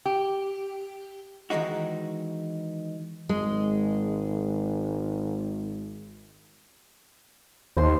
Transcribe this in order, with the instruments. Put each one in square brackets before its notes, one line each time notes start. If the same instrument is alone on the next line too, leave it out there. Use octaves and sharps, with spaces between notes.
[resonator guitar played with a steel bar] G4
[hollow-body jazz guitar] D#3 E3 G#3 D#4 F#4
[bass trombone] G#1 [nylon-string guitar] G#3
[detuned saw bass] D#2 [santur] C5 C6